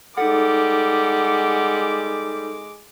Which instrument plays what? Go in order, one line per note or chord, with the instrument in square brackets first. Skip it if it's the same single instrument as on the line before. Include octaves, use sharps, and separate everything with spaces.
[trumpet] G3 [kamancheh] G#3 D6 [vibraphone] D#4 A4 [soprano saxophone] F#5